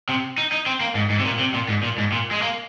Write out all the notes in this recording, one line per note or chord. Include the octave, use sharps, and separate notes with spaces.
C3
D#4
D#4
C4
A#3
G#2
G#2
C3
A#2
C3
A#2
G#2
A#2
G#2
A#2
G#3
A#3